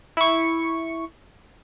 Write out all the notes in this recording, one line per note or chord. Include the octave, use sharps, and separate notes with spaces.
E4 C#6